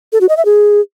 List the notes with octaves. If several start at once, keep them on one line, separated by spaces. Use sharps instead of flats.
A4
F#4
D#5
E5
G#4